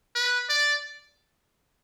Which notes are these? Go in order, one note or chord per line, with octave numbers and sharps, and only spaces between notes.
B4
D5